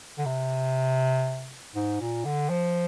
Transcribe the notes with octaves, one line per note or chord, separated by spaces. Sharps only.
D3
C3
G#2
A#2
D3
F3